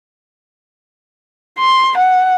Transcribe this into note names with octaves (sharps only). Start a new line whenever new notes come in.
C6
F#5